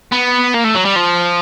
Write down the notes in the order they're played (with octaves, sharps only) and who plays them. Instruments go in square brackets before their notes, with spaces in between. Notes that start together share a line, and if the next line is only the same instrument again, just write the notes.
[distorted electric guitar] B3
A#3
A3
F#3
G3
F3